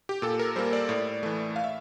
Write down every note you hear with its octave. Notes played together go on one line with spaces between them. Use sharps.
G4
A#2 A4
A#4
G3 A#3 C5
D5
A2
E3 A3
F5
E5